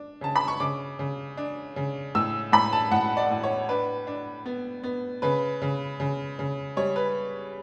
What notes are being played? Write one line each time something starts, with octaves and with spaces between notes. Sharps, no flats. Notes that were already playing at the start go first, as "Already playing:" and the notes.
Already playing: D4
C#3 A5
B5
C#6
C#3 D6
C#3
D4
C#3
A2 E6
A2 B5
A5
A2 F#5
D5
A2
C#5
D4 B4
D4
B3
B3
C#3 B4
C#3
C#3
C#3
G3 C#5
B4